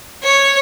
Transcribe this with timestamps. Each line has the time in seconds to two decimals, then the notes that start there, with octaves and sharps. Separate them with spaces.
0.23 C#5